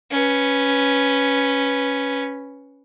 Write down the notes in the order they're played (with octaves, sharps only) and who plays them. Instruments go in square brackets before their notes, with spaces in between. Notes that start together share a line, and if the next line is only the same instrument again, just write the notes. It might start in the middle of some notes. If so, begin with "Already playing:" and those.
[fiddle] C#4 B4